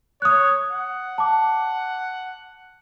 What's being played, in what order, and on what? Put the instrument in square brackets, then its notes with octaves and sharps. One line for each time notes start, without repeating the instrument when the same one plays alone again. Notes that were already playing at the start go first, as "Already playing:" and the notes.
[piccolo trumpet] C#5 [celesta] D#6 F#6
[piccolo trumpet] F#5
[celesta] A5 D6